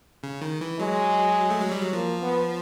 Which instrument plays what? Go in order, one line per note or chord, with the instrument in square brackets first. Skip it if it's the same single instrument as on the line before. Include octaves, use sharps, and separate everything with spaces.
[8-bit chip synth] C#3
D#3
E3
[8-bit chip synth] F#3 [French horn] G#3
[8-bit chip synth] A3
G#3
G3
F#3
[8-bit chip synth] F3 [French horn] A#3
[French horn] B3